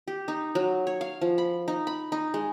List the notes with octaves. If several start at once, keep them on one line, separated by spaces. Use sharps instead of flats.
G4
D#4
F#3
C#5
F5
F3
B5
D#4
B5
D#4
G#3